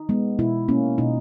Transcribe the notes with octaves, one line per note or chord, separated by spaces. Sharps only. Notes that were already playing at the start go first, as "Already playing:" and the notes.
Already playing: D#4
G#3 B3
B2 E4
A#3 C#4
B2 D#4